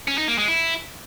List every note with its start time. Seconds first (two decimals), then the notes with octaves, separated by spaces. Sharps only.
0.08 C#4
0.18 D#4
0.28 A#3
0.38 G#3
0.48 E4